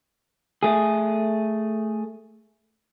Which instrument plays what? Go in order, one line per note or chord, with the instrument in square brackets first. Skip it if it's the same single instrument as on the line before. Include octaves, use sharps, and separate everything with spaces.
[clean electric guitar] A3 G#4